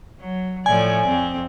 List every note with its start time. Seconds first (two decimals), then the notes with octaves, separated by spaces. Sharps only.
0.20 F#3
0.66 A2 F3 D5 G#5
1.07 F2 C4